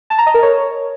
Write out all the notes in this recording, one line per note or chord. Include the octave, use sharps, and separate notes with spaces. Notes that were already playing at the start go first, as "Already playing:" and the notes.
A5
A#5
D#5
A#4
C#5